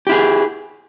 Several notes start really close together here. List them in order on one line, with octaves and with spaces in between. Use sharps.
G4 E4 G#4